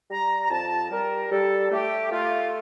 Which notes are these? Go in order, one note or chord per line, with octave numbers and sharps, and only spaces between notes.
G3 A#5
A#5
F2 A5
G3 A#4
G3 A4
A3 G4
A3 F4